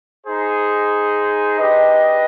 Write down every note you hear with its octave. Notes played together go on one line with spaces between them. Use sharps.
D#4 G#4 C5
D4 G4 B4 D#5